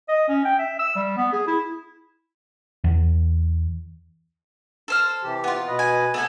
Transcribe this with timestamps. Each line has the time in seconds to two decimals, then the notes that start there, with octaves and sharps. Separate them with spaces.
0.09 D#5
0.29 C#4
0.45 G5
0.59 E5
0.79 E6
0.96 G3
1.17 B3
1.33 G#4
1.47 E4
2.84 E2
4.88 A4 C5 F6
5.23 C3 E3 G4
5.44 B3 F4
5.67 B2 B4 D#5
5.79 G#5
6.14 C3 A3 B3 A4 G#5